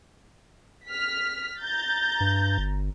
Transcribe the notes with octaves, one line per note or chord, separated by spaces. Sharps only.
F6 B6
A#5 G6 A6
G2
G1